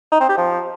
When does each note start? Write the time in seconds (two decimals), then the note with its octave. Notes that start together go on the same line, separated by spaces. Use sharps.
0.12 D#4
0.20 C4
0.29 G4
0.38 F3